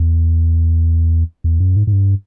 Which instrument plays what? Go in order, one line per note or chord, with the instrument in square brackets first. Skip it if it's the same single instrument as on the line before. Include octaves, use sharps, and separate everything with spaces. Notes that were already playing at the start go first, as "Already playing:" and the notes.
Already playing: [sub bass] E2
E2
F#2
G#2
G#2
G2